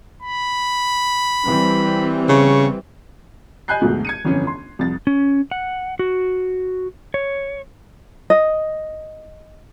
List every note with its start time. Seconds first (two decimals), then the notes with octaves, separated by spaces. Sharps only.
0.23 B5
1.44 E3 G3 C4
2.29 C#3 C#6
3.68 D#5 G#5 B5 F#6 G6 C7
3.81 D2 G#2 B2 F#3 A3
4.05 G#6 C#7 D#7
4.25 G1 F2 E3 C#4
4.47 C6
4.79 C2 F2 A6
5.07 C#4
5.51 F#5
5.99 F#4
7.14 C#5
8.30 D#5